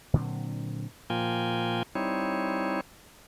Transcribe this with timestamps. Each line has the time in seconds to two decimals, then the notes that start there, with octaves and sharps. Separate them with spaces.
0.13 A#2 D3 F#3 C4
1.10 A#2 F3 A#3 F4 G5 G#5
1.95 G3 C4 D#4 E4 C#5